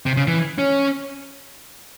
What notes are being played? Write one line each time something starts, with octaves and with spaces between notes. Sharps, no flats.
C3
C#3
E3
C#4